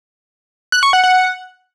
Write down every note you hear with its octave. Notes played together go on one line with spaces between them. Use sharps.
F#6
C#6
F#5
F#5